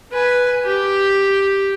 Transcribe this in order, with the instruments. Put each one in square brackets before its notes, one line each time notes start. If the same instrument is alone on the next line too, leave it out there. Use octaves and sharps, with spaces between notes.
[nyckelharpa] B4 G#5
G4